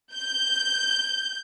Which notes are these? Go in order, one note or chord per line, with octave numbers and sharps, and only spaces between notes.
G6